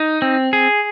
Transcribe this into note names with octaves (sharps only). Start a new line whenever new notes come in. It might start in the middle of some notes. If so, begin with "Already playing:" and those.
Already playing: D#4
C4
G#4